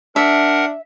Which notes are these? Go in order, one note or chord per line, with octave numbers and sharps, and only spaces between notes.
D4 A#4 E5 F#5